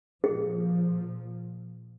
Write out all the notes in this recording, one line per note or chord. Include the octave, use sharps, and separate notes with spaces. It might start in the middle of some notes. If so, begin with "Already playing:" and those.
A#2 F3 G#4